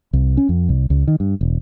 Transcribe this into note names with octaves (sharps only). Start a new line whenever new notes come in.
C2
C#4
F2
C2
C#2
D#3
G2
E1